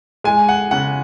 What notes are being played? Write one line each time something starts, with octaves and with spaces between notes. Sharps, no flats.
G#3 G#5
F#5
C#3 F#5